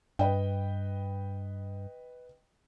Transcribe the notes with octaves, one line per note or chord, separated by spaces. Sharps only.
G2 B4 D#5 G5